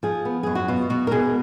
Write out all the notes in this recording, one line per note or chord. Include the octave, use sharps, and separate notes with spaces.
F3 G#4
B3
F#2 G#4
F#4
B2 F4
B2 F#4
A#4
B2 G#4